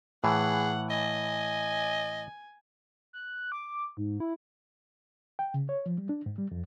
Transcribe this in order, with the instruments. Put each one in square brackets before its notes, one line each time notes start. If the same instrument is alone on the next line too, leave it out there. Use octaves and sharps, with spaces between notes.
[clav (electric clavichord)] A2 E3 [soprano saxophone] G#4 [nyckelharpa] F#5
[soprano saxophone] D#5 [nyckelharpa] G#5
[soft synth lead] F#6
D6
G#2
E4
[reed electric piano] G5
C#3
C#5
F3
G3
D4
G#2
G3
F2